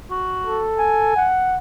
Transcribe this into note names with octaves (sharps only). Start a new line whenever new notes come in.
F#4
A4
G#5
F#5